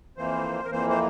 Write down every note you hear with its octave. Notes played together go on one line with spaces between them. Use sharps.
F2 E3 A#3 C5
A#4
F2 E3 A#3 C5
C5